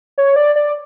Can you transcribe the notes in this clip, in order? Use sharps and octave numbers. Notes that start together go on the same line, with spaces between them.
C#5
D5
D5